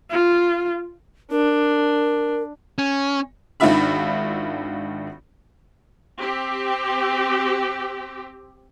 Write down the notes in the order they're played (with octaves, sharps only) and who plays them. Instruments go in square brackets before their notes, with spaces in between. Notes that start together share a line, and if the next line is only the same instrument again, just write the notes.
[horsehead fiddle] F4
[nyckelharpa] D4 [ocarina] A#4
[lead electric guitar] C#4
[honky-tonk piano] G#1 D#3 D4 F4 E5 B5
[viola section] C4 G4